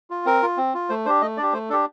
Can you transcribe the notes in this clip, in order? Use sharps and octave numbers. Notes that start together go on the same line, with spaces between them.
F4
C4 A#4
F4
C4
F4
A3 C5
D4 G4 C5
A3 D#5
D4 G4 D5
A3 C5
D4 G4 A4